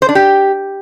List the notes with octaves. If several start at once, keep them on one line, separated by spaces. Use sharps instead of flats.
C5
D4
G4